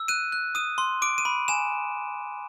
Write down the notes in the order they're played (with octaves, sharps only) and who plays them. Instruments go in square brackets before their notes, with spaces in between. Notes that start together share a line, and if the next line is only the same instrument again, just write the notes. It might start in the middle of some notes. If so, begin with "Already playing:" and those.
Already playing: [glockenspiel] E6
F#6 D#7
F#6
D#6 D#7
C6
D6 D7
D#7
B5
G#5 E7